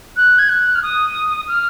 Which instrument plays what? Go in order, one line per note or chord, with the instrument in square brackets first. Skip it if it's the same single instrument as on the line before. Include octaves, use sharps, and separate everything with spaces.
[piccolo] F#6
G#6
F#6
F6
D#6
F6